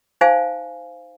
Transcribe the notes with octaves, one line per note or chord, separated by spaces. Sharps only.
D#4 C5 F5 G#5